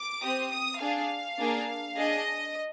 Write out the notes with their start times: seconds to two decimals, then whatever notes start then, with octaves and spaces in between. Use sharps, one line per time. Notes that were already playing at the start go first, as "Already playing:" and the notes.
Already playing: D6
0.22 C4 G4 D#6
0.51 D#6
0.81 D4 G#4 F5
1.39 A#3 D4 G#4
1.97 D4 G#4 D#5